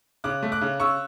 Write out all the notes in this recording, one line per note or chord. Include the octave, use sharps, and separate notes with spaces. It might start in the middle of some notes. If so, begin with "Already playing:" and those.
C#3 D6 F#6
A3
D6 F#6
C#3
C#3 C#6 E6